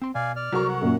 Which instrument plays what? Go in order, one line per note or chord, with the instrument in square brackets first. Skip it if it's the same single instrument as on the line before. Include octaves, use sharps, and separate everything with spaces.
[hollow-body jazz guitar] C4 C6
[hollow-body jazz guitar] B2 [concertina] D5 F5 G#5
[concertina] D5 F6
[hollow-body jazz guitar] C2 A4 [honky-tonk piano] F#3 A#4 C#6
[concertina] F#5
[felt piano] F#2 A#2